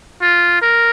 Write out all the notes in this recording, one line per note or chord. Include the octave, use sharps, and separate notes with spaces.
F4
A#4